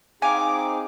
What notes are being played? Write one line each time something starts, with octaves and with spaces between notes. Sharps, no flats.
C4 D#4 G#4 F5 G#5 D6